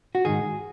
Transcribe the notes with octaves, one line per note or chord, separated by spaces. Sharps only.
F#4
G#2 D#3 G#4